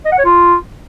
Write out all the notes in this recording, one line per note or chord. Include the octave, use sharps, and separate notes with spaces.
D#5
F#5
C#5
F4